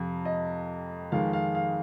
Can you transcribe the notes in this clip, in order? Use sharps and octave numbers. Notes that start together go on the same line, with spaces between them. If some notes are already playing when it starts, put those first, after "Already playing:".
Already playing: F2 C3 F3
D#5
F2 D#3 G#3 F5
F5
F5